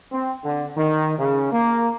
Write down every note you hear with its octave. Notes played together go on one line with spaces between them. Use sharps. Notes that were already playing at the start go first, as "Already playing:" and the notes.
C4
D3
D#3
C#3
A#3